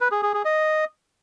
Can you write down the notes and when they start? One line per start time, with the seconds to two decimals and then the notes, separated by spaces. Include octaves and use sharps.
0.01 B4
0.12 G#4
0.23 G#4
0.34 G#4
0.45 D#5